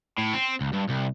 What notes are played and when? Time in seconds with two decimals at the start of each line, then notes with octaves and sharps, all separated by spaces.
0.18 A2
0.34 C4
0.61 C#2
0.73 G2
0.90 C2